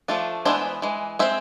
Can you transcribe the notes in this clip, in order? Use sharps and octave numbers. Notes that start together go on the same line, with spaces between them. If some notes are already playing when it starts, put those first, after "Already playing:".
F3 A3 D4 F4
E3 G#3 B3 D4 C5 E5
E3 G#3
G#3 C4 C5 E5